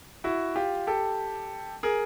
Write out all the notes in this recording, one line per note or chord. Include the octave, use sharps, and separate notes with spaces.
E4 F#4
F4 G4
G4 A4
G#4 A#4